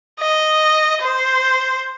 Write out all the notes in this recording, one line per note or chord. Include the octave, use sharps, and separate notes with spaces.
D#5
C5